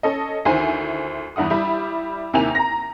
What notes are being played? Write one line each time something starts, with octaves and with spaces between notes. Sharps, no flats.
C#4 A4 D#5
D2 D#3 E4 C5 G#5
E2 G2 E4 F#5 D#6
G3 E4 B5
D#2 C3 A#3 E5 G#5 F7
A#5 A#6